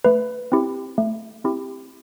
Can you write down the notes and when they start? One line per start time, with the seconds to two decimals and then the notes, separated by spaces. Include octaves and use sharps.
0.05 A3 B4
0.52 C4 E4 G4
0.98 A3
1.44 C4 E4 G4